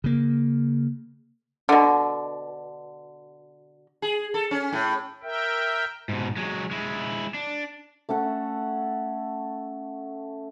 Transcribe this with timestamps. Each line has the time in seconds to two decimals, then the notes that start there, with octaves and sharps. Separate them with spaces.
0.04 C#3 A#3
1.69 B2 D3
4.02 G#4
4.34 A4
4.51 C#4
4.73 A2
5.23 A#4 E5 G5
6.09 G#2 B2
6.36 F#3 G#3
6.71 G#3 E4
7.34 D4
8.09 A3 C#4 A4 F#5